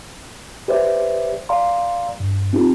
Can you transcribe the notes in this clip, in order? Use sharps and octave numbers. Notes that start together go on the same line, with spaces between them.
G4 B4 C5 D5 E5
D5 F5 A#5 C6
G2
C4 D#4 F4 G4